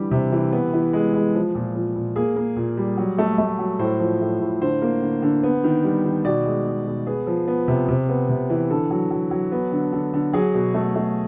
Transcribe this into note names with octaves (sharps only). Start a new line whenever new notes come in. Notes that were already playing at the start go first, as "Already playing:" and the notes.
Already playing: D3 E3 G3 G4
C3
E3
B3
E3
G#3
G#3
F3
A#2
F3
A#2
A#3 G#4
A#3
A#2
G3
F#3
A3
A3
F#3
A2 C5
F3
A2
A2
D3 C5
A#3
D3
D3
B3
D#3
G3
D#3
B2 D5
G#3
G#3
B2
B3 G#4
F3
B3
C3
C3
B3
C3
E3
D3 A4
F#3
F#3
F#3
B3
D3
D3
D3
F#3 G#4
B2
A3
A3